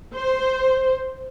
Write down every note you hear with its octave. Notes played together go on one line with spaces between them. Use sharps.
C5